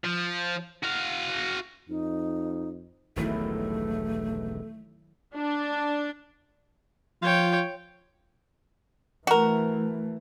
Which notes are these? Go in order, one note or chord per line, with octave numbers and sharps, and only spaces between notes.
F3
F#4 F5
F2 D#4
E1 B1 G2 D#3 F#3 A3 E4 A4
D4
F3 F4 C#5 G5
E3 A3 F#4 A#4